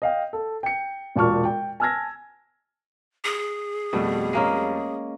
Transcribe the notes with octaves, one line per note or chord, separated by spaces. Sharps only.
D#5 F5 G5
A4
G5 C#7
E1 A#2 A5 C#6 F6
G5
G#5 A5 E6 F6 G#6 A#6
G#4
F2 B2 G3 A3
G#3 A#3 C#4